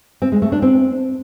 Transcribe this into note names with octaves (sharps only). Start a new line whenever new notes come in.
C4
G#3
A3
D4
C4